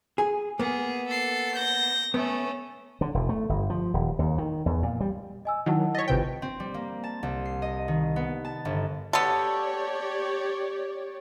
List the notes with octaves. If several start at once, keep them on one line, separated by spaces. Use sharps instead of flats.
G#4
A#3 B3 G#4
A4 C7
G6 A#6
A3 B3 C#4
D3
E1
A3
G1
F3
D#1
D#2
D#3
E2
A#2
G3
D#5 G#5 E6
D#3 F#3 E4 F#5 A5
C#5 D#5 A6 B6
G#1 C3 F4 B4 C5 G5
C4
G3
A#3
A5
C2
C7
D#5
D#3
B3
A5
G1
B3 G4 A4 C#5 D5